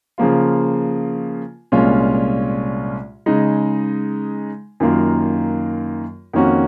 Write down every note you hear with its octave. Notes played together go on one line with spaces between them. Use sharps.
C#3 F3 A#3 F4
C2 A#2 G#3 C#4 F4
C#3 G#3 D#4
F#2 D#3 A#3 F4
F2 D#3 A#3 C#4 F#4